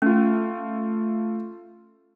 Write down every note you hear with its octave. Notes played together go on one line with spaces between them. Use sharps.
A3 C#4 F4